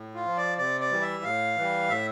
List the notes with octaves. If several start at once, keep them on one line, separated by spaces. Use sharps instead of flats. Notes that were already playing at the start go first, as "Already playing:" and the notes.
Already playing: A2
F4
F3
D5
C3 D5
D5
E3 G3
E5
A2 F5
E3 G3
A2 E5